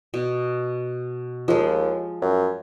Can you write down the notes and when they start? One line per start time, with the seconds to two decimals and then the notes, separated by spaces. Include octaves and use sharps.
0.14 B2
1.48 D#2 F3 G#3
2.22 F#2